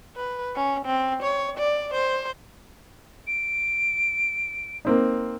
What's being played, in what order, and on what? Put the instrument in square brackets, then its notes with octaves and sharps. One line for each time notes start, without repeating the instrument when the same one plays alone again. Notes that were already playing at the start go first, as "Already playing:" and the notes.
[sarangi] B4
C#4
C4
C#5
D5
C5
[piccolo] D7
[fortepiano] A#3 C4 D#4